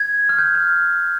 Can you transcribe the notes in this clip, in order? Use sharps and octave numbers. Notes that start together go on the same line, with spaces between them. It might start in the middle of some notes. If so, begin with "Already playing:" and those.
Already playing: G#6
F6
G6
F6